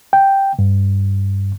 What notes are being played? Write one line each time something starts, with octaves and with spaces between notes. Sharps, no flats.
G5
G2